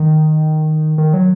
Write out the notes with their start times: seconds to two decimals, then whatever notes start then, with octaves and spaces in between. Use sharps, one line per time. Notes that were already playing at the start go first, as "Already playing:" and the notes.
Already playing: D#3
0.98 D#3
1.14 F#3